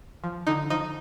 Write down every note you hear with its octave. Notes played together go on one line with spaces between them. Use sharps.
F3
D3 D#4
F3 D#4